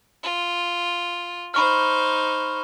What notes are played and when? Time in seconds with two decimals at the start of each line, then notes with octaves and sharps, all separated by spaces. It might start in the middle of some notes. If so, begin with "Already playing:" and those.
0.23 F4
1.54 D#4 C5 B5 C#6 F6